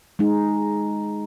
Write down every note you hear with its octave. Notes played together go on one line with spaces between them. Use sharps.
G#3 D#4